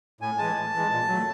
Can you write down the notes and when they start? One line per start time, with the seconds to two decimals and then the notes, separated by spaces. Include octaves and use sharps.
0.21 A2 G#5
0.38 E3 G#3 A5
0.55 A2
0.74 E3 G#3
0.91 A#2
1.08 F#3 A3